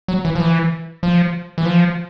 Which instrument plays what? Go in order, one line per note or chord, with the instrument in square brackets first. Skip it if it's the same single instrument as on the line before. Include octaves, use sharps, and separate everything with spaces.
[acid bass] F#3
E3
F3
E3
F3
E3
F3